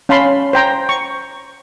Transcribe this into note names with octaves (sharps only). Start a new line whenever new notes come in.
C#4 F5 A5 B5 C6
C5 G5 A#5
C#6